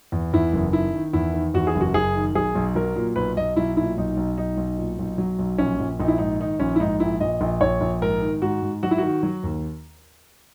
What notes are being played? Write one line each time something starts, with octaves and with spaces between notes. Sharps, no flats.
E2
E2 E4
F#1
D#3 E4
D#3
E2 E4
D#3
E2 F#4
G#4
F#1
F#4
F#1 G#4
D#3
B1 G#4
B1
F#3 A#4
A#2
B1 B4
B1 D#5
B1 E4
A#2 E4
B1 D#4
B1
B1 D#4
B1
A#2
B1
F#3
B1
A#1 C#4
A#1
A#1 D#4
E4
G#2 D#4
D#3 D#4
A#1 C#4
E4
G#2 D#4
A#1 E4
A#1 D#5
A#1
A#1 C#5
A#1
G#2 A#4
D#3
G#2 F#4
G#2
F#3 F#4
E4
D#3 F#4
F#3
D#2